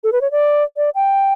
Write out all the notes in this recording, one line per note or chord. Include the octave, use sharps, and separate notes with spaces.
A4
B4
C#5
D5
D5
G5